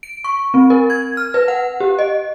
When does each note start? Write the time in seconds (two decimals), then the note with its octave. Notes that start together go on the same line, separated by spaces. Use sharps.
0.03 D7
0.24 C#6
0.54 C4
0.70 A#4
0.90 G#6
1.17 F6
1.34 B4
1.48 F#5
1.80 G4
1.99 D#5